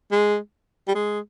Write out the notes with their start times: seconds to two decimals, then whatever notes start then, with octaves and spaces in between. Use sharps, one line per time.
0.12 G#3
0.88 G3
0.95 G#3